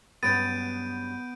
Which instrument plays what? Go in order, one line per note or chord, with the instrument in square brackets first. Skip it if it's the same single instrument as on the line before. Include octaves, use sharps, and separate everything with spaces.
[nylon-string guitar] G2 F#3 C#4 [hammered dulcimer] B3 [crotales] G6 D7 D#7 [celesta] A6